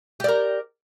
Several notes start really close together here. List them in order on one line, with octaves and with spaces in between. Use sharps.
G4 D5 A#4